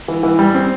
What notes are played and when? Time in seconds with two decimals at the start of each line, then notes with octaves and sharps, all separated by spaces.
0.08 E3
0.23 E3
0.39 G3
0.54 C4